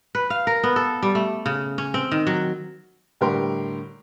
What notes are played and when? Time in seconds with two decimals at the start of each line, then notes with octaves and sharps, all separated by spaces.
0.15 B4
0.30 F5
0.47 A#4
0.63 B3
0.76 A4
1.03 G3
1.15 A3
1.46 C#3
1.78 C#4
1.94 C4
2.11 D#3
2.27 F#3
3.21 A2 D3 G3 G4 A#4 C6